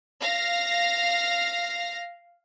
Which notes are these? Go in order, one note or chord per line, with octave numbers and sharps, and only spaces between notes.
F5 A#6